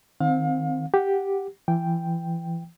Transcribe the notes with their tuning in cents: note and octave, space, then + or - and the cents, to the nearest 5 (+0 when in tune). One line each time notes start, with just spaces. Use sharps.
D#3 +0 C4 +0 F5 +35
G4 +0 F#5 +0
E3 +30 G5 +0